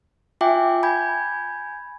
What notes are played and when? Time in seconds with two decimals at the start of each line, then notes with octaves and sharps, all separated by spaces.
0.41 F4 E5 G5 G#5 D6
0.83 G#5 B5 G6 G#6